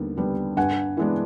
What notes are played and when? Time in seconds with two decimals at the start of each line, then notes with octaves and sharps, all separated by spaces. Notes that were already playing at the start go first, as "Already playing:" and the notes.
Already playing: D#2 D3 G3 B3
0.17 D3 G3 B3 D4
0.57 G2 F#5 G#5
0.97 E3 G#3 B3 D4